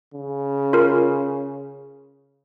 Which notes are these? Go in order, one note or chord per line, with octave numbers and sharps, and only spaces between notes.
C#3
F4 A#4